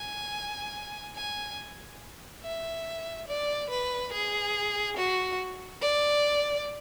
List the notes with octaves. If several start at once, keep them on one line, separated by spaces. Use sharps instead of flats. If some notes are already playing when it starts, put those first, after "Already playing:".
Already playing: G#5
G#5
E5
D5
B4
G#4
F#4
D5